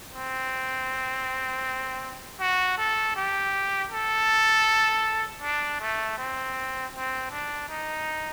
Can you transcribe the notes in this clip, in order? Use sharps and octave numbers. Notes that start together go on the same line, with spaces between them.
C4
F#4
A4
G4
A4
D4
A3
C4
C4
D4
D#4